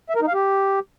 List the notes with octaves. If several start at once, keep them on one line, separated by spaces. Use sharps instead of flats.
E5
A#4
D#4
F5
G4